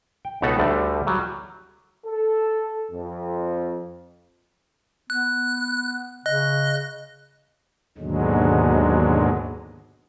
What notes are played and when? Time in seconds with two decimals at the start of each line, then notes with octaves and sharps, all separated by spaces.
0.25 G5
0.42 C#2 B2 B3 D#4 A4 F#5
0.59 D2 D3 G3 A3
1.07 F#3 G3
2.06 A4
2.92 F2
5.10 B3 F#6
6.26 C#3 D#5 F#6
7.98 D#2 G#2 B2 D3 F#3 G#3